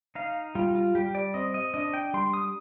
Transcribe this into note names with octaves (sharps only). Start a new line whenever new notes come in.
D#4 F5
G3 F4
F4
G3 G4
D5
C4 D#5
D#5
D4 D#5
G5
G3 C6
D#6